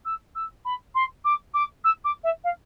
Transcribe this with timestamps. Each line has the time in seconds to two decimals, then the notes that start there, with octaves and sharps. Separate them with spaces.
0.05 E6
0.35 E6
0.64 B5
0.94 C6
1.24 D6
1.53 D6
1.84 E6
2.04 D6
2.23 E5
2.43 F5